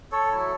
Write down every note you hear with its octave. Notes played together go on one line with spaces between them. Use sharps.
A4 C#5
F#3 A3 E4